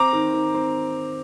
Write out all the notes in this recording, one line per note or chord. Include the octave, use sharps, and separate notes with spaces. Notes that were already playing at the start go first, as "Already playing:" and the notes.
Already playing: C4 A#5 D6
D#3
D#3
C4